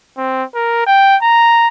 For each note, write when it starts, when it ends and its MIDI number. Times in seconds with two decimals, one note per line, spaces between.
0.18 0.44 60
0.55 0.82 70
0.87 1.16 79
1.22 1.68 82